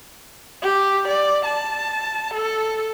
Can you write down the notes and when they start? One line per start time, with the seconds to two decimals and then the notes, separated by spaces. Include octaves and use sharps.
0.62 G4
1.08 D5
1.45 A5
2.34 A4